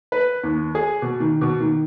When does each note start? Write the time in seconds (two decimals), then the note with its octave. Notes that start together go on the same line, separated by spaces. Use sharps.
0.12 B4
0.44 D#2
0.75 G#4
1.02 B2
1.20 D#3
1.41 B2
1.61 D#3